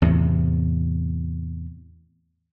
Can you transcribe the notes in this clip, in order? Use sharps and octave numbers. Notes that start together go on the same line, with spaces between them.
E2 A2 C3